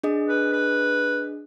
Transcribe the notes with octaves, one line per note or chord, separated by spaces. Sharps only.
D4 G#4 D#5
B4
B4